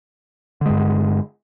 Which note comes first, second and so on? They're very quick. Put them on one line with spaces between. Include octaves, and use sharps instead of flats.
D3 G#3 G2